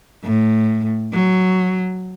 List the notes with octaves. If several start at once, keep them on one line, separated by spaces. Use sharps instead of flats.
A2
F#3